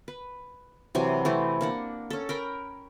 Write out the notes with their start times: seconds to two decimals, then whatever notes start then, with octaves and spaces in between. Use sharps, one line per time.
0.08 B4
0.95 C3 E3 F#3 G#5
1.25 E3 A3 C4
1.61 A#3 D4 F#5
2.10 C#4 A4
2.29 A#4 G5 B5